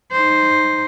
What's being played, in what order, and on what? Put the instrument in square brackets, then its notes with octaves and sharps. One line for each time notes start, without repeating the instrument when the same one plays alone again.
[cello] D#4 C5